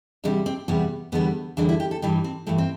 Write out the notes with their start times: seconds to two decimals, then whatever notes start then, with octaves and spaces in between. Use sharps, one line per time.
0.24 E2 C3 G3 D4
0.46 C4
0.68 E2 C3 G3 B3
1.12 E2 D3 G3 B3
1.57 E2 D3 G3 D4
1.69 E4
1.80 G4
1.91 A4
2.02 G2 E3 G3 G4
2.24 C4
2.47 G2 E3 G3 A3
2.58 C4